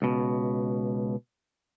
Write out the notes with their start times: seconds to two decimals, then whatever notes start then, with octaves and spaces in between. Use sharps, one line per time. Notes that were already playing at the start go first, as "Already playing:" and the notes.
0.02 C#2 B2